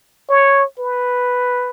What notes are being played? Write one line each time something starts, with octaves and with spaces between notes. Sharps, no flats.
C#5
B4